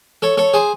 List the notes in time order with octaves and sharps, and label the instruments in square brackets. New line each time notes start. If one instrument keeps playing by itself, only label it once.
[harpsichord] A4 C#5
A4 C#5
G#4 C5